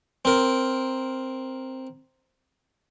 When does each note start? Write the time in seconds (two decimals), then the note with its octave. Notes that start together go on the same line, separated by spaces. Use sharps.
0.25 C4 A#4